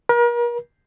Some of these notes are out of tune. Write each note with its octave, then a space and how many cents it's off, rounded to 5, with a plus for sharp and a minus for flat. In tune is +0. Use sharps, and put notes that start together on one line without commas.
A#4 +40